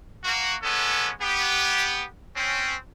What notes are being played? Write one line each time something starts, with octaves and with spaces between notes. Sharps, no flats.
A#3 F#4
G#3 B3 C#4 A4
B3 G4
C4 C#4